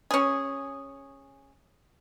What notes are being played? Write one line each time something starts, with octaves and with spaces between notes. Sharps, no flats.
C#4 G#4